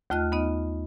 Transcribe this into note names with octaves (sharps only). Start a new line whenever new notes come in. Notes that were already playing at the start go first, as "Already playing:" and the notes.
D#2 A3 F4 D#5 F6 F#6
B3 D#4 D#5